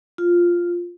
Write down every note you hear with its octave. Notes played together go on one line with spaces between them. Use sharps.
F4